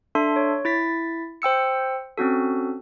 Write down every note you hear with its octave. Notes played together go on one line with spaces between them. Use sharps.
D4 A4 E5 C6
C#5
E4 A6 B6
C5 G5 E6 C#7
C4 C#4 F#4 A4